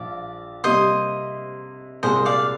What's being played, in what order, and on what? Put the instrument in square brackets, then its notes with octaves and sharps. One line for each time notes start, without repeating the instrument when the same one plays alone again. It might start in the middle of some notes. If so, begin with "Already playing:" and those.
Already playing: [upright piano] A#1 F3 [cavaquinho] D5 F5
[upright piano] C3 G3 A#3 [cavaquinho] C5 D#5
[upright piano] C2 A#2 G#3 C4 [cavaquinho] C5 D#5
[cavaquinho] D5 F5